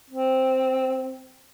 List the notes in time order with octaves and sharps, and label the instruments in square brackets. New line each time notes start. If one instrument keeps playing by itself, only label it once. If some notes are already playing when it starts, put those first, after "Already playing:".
[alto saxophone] C4